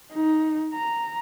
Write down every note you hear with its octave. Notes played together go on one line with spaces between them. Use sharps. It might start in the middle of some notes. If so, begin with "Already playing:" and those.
D#4
A#5